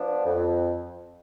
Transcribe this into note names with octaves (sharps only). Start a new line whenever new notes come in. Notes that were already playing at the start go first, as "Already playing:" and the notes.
Already playing: F3 B3 D4
F2